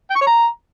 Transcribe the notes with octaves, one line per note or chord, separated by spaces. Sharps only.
G5
C#6
C#5
A#5